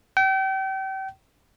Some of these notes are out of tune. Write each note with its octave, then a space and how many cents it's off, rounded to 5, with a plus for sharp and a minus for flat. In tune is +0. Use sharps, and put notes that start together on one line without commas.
G5 -35